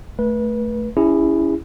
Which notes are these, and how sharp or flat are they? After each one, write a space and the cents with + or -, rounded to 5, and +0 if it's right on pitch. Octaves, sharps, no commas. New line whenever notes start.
A3 +0 B4 -30
C#4 +25 E4 +0 G#4 -35